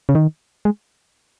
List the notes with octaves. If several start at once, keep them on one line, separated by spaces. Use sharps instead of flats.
C#3
D#3
G#3